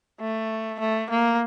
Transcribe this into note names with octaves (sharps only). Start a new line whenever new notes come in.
A3
A3
A#3